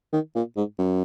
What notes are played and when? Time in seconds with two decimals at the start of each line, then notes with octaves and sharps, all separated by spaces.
0.13 D#3
0.35 A#2
0.57 G#2
0.79 F#2